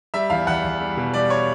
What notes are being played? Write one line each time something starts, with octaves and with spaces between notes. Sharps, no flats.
G3 E5
E2 F5
E2 F#5
E2
G3
B2
G3 D5
C#5